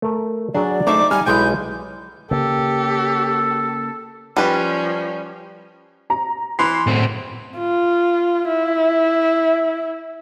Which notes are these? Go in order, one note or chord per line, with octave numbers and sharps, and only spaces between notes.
A3 A#4
F#3 D4 F#4 G#4 D5
A3 D#4 C5 E5 D6
G3 D#4 G#5 F6
B1 G#3 E4 G#5 A5 G6
C#3 A#3 G4 A4
F3 G3 C#4 B4
A#5
E3 C6 C7
A2 C4
F4
E4